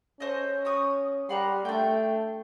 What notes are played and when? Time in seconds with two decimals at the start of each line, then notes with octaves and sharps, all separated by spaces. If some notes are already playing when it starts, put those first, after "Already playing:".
0.20 C#4 A4 C5 D#5
0.65 F#4 C#6 D#6
1.29 G3 A#4 F#5 C6
1.65 A3 D4 G5